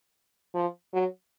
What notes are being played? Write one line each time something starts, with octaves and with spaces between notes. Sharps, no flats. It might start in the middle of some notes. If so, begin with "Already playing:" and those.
F3
F#3